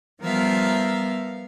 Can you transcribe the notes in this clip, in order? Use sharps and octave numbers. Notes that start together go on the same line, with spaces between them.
F3 G3 B3 A#4 E5 F5